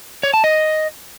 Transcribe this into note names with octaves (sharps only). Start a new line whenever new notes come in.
C#5
A5
D#5